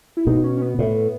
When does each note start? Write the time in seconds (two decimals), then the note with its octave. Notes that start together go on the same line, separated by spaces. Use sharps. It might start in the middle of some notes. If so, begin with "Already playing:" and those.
0.17 E4
0.27 B2 D#4
0.44 C#4
0.57 C#4
0.62 B3
0.79 A2